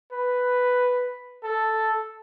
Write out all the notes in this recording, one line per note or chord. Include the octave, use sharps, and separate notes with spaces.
B4
A4